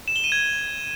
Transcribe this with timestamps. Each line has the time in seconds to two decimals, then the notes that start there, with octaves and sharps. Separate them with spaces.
0.08 E7
0.16 G7
0.24 D#7
0.32 G#6